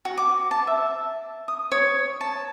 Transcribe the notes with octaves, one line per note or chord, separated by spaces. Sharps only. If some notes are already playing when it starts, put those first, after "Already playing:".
F#4
D6
A5
E5
D#6
C#5
A5